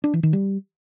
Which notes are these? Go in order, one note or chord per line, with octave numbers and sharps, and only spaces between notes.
D4
E3
D#3
G3